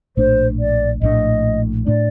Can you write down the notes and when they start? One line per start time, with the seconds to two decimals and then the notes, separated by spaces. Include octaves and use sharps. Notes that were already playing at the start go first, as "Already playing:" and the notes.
0.17 A#1 A2 A3 D4 C5
0.59 D5
1.02 A#1 A2 A3 D4 D#5
1.86 A2 A3 D4 D5